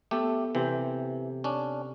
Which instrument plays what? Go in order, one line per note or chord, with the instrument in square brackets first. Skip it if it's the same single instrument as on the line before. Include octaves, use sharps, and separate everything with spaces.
[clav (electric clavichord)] A3 G4 [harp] B3 A4
[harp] C3 G4 C5 [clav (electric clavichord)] E3
[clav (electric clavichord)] C#4 D4